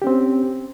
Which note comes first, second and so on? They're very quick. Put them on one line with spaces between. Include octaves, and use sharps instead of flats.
G4 C#4 C4